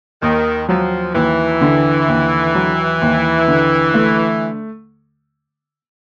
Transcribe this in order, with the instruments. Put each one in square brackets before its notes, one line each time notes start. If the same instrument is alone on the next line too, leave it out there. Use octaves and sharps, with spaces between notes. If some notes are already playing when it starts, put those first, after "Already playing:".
[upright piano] D#2 [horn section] D#3
[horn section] F3 [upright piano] F#3
[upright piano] D#2 [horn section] E3
[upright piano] D3
D#2
F#3
D#2
D3
A3